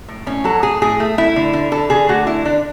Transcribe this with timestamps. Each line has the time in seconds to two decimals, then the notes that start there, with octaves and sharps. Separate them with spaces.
0.08 A2
0.26 A2 C#4
0.44 F#3 A4
0.62 A2 G#4
0.82 A2 G#4
1.00 A3
1.18 A3 E4
1.36 D3
1.53 D3
1.72 D3 A4
1.90 D3 G#4
2.08 A3 F#4
2.27 D3 E4
2.45 D3 D4